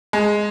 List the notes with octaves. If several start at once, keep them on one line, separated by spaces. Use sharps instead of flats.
G#3